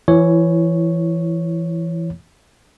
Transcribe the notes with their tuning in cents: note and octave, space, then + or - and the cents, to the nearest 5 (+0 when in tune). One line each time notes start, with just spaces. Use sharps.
E3 +25 E4 +0 C#5 +0